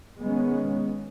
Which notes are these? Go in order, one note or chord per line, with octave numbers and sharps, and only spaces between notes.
D#3 G#3 B3 C#4